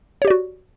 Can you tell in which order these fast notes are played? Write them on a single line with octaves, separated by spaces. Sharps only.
C#5 G4 D5 F#4